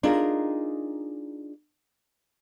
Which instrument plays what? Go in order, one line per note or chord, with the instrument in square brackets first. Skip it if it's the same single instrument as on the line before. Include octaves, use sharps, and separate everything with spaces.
[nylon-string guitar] D4 D#4 F4 G#4 A#4